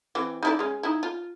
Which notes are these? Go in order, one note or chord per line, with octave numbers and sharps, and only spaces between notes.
E3 C4
D#4 E4 D5
G#3 C#4
D#4 E4
F4